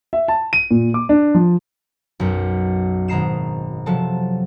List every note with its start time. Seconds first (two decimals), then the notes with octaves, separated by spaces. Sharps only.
0.13 E5
0.28 A5
0.53 D#7
0.71 A#2
0.94 D6
1.09 D4
1.35 F3
2.20 B1 F#2
3.08 G#1 B2 A#5 C7 E7
3.86 C3 F3 F#3 A4 A5